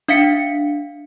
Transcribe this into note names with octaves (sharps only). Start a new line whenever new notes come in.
D4 E5 F5 B6 C#7